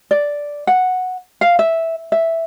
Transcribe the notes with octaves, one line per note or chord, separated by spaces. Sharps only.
D5
F#5
F5
E5
E5